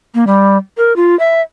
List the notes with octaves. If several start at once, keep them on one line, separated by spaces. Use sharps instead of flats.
A#3
G3
A#4
F4
E5